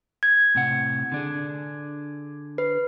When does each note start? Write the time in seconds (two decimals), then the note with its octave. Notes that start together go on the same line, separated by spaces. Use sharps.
0.23 G#6
0.55 A2 C3 F#5
1.12 D3 D4 G#4
2.58 B4